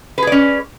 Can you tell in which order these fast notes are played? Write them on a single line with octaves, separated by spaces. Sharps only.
B4 G#4 D5 C#4